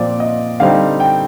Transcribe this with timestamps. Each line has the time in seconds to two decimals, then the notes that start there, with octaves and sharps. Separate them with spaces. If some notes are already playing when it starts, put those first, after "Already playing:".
Already playing: A#2 F3 C4 D5
0.20 D#5
0.60 D3 G3 C4 D#4 F5
1.00 G5